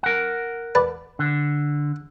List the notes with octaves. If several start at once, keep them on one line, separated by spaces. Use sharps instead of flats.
A#4 F#5
B4 D5 A5
D3